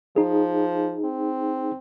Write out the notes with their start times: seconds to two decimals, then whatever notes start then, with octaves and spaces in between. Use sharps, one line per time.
0.16 F3 D#4 G#4
1.04 C4